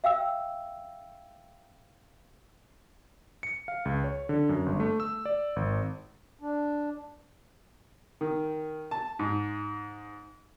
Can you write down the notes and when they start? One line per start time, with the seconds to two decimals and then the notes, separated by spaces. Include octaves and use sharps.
0.04 E5 F5 G5 E6
3.43 C#7
3.68 F5
3.85 C#2
4.04 C#5
4.29 D3
4.49 F#2
4.66 G1
4.80 A3
5.00 E6
5.25 D5
5.56 G#1
6.41 D4
8.21 D#3
8.91 A5
9.19 G#2